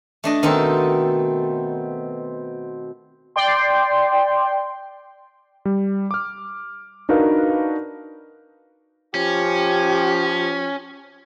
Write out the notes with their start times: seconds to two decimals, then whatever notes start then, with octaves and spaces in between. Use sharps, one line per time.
0.24 A3 D4 D#5
0.43 B2 D#3 C4 D#4 A4
3.36 D5 G5 C6
5.65 G3
6.11 D6 F6
7.09 D4 D#4 F#4 A#4 B4 F5
9.15 F3 C#4 G4